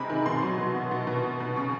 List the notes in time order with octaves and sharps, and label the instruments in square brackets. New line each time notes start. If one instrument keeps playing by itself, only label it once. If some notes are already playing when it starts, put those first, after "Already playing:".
Already playing: [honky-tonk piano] C3 G#3 C4 G#5 A#5 B5
D#3
B2 C6
F#3
B2
B3
B2
B2
B3
B2
C#3 C#6